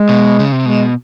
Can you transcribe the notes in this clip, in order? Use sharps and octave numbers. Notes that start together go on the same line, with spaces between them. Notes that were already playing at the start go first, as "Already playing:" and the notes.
Already playing: G#3
B2
C#3
C3
B2 G#3